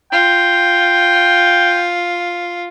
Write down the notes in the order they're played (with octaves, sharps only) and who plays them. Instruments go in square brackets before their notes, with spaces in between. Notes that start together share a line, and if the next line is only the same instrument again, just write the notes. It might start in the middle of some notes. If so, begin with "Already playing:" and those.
[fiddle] F4 [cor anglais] G5